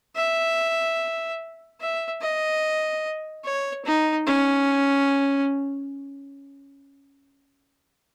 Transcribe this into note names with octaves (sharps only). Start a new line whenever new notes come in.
E5
E5
D#5
C#5
D#4
C#4